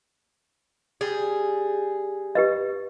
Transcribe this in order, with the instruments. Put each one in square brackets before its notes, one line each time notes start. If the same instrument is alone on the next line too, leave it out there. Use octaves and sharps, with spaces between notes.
[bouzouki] G3 G#4
[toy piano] G4 B4 D#5